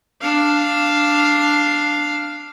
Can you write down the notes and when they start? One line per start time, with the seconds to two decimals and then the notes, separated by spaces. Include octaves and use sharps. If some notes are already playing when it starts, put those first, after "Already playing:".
0.21 D4 F5